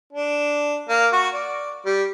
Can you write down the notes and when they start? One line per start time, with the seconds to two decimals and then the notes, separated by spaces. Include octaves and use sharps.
0.12 D4
0.89 A#3
1.12 F#4
1.33 D5
1.85 G3